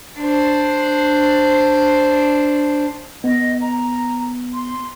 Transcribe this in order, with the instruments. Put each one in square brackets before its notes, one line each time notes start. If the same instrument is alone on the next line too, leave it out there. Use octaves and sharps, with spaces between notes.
[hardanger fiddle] D4 C5
[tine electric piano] B3 [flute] D#5
[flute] A#5
C6